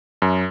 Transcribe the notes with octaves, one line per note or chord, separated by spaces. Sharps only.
F#2